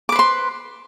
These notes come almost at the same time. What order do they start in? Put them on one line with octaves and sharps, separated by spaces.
D6 B4 C5 C6